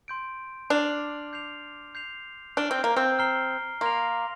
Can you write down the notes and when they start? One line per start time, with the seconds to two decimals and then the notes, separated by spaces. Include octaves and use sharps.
0.08 C6 G6 D7
0.70 D4 D6 F6 C7 F7
1.33 G6 C7 F7
1.95 G6 C7 F7
2.57 D4 F6 D7 G7
2.71 C4
2.84 A#3
2.97 C4
3.19 A#5 F6 C7 G7
3.81 A#3 C6 A#6 F7